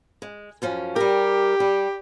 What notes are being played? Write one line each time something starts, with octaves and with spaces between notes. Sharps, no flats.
G#3
F#2 F3 C#4
G3 G4 A#4
G3